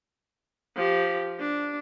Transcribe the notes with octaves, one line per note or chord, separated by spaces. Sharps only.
F3 G4
D4